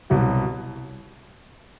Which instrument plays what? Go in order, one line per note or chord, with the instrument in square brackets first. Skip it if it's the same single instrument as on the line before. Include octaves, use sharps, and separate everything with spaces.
[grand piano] C2 B2 F#3